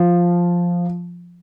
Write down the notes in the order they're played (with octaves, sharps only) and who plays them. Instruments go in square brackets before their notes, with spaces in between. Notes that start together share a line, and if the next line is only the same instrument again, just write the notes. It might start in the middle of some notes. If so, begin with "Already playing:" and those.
Already playing: [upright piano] F3